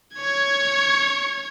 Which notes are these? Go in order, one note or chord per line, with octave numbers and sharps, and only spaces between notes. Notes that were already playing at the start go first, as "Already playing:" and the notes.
C#5 G#6